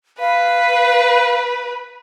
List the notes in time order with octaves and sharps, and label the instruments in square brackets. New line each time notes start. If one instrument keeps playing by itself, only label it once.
[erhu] B4 [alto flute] F5